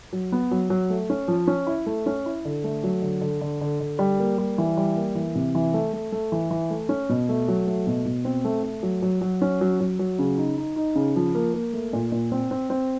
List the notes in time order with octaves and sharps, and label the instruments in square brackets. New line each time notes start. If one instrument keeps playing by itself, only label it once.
[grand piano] F#3
B3
F#3
F#3
A3
C#4
F3
C#4
E4
A3
C#4
E4
D3
A3
F#3
D3
D3
D3
D3
D3
G3
A#3
G3
E3
G3
A#3
E3
C3
E3
A3
A3
A3
E3
E3
A3
C#4
B2
A3
F#3
A3
B2
B2
C4
A3
A3
F#3
F#3
F#3
C#4
F#3
F#3
F#3
C#3
D#4
D#4
D#4
C#3
F3
A#3
A#3
A3
A#2
A#2
C4
C4
C4